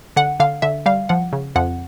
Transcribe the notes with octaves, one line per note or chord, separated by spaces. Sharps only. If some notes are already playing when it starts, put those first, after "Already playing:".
D3 F#5
D3 F5
D3 E5
G3 F5
F3 F#5
C#3
F2 F#5